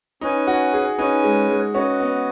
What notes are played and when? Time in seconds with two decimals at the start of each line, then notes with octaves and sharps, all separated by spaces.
0.21 C#4 D#4 B4 G#5
0.47 F#4
0.73 G#4
0.98 C#4 D#4 B4 G#5
1.24 G#3
1.49 G#3
1.74 C#4 F#4 B4 D#5
2.00 B3